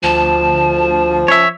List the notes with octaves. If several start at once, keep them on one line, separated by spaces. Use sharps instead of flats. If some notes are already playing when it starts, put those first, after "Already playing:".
D2 F3 A5
C#4 C#5 E5